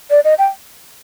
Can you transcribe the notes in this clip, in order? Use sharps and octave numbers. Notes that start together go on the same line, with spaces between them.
D5
D#5
G5